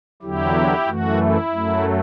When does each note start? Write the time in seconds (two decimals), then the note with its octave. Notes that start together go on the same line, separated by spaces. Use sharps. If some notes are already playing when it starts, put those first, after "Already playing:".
0.22 E2 D3 F#3 E4 G4
0.86 F#2 E3 A3 F#4
1.18 E4
1.51 F#2 F#3 A3